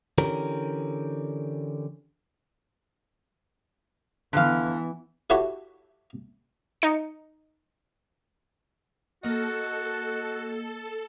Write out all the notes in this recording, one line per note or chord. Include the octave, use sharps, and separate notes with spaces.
D3 E3 C#4 G4 A#4
D3 E3 B3 F5
E4 F#4 G4 A4 C#5 E5
D#4 C#7
A#3 F#4 A4 D#5